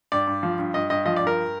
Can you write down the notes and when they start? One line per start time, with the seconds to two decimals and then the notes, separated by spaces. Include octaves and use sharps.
0.12 G2 D5
0.27 G2
0.43 F3
0.58 G2
0.74 G2 D#5
0.90 G2 D#5
1.06 F3 D#5
1.16 D5
1.21 G2
1.27 A#4